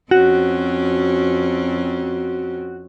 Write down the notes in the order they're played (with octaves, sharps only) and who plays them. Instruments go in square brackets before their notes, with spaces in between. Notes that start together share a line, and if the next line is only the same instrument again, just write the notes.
[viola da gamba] F2 C4 C#4 [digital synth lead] F#4